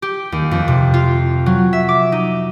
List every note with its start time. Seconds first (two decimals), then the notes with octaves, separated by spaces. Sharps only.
0.02 G4
0.32 D#2
0.51 F2
0.68 C3
0.94 F4
1.46 F#3
1.73 E5
1.89 D6
2.12 D#4